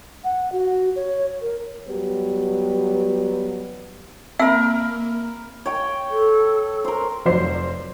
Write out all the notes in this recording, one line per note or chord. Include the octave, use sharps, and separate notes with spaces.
F#5
F#4
C#5
A#4
F#3 G3 B3 G4 B4
A#3 C4 A#4 E5 B5 E6
C#5 G5
A4
A#4 C5
F1 F#3 C5 D5 C7